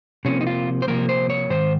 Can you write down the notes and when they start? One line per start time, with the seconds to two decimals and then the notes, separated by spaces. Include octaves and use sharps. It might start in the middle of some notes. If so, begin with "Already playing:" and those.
0.25 C3 F3 A#3 C#4
0.41 D#4
0.47 F4
0.82 C5
0.88 C3 F3 A#3 A#4
1.09 C5
1.30 C#5
1.50 G#2 D#3 C5